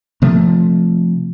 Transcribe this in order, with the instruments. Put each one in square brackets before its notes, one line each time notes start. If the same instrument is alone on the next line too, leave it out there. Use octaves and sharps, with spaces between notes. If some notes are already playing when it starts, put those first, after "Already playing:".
[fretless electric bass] C3 F3 A3